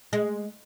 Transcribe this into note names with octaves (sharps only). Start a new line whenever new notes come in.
G#3